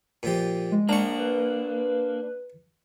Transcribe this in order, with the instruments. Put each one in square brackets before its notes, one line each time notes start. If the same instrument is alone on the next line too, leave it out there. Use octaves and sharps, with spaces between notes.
[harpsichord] A#2 F3 G4
[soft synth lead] G#3
[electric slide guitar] A#3 D4 [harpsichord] A#5 C#6
[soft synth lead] B4